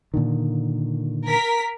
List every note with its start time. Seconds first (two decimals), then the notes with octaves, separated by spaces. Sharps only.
0.14 A#2 D3 D#3
1.27 A#4 B6